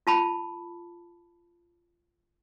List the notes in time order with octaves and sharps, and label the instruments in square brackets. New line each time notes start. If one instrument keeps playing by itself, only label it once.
[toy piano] F4 A5 B5